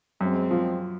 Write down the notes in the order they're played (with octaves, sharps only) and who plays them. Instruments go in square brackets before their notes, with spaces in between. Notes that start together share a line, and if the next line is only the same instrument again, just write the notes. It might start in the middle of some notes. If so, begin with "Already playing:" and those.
[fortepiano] F#2 [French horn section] G#3 C4
[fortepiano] F3